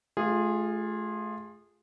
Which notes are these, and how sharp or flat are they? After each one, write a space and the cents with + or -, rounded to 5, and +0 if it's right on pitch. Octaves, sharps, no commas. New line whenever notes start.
A3 -35 F4 +10 G#4 -20